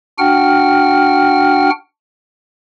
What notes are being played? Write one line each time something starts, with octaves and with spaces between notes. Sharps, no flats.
D4 F#4 F#5 G5 F6